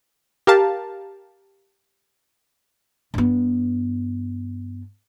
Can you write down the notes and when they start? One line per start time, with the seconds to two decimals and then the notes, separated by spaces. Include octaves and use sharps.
0.47 G4 A#4 F5 A5
3.14 G2 B3